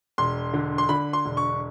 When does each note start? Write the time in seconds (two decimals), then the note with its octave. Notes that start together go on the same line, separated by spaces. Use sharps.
0.18 E1 C6
0.53 D3
0.78 C6
0.89 D3 B5
1.13 C6
1.25 E1
1.37 C#6